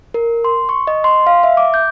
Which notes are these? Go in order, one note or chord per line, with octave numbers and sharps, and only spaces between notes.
A#4
C6
C#6
D#5
C6
F5
E5
D6
G6